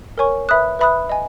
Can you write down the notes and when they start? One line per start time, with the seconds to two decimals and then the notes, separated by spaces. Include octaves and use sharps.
0.18 A#4 C#5 G#5 C#6
0.49 B4 E5 B5 D#6 F#6
0.79 B4 E5 B5 D#6 F#6
1.09 D#5 G#5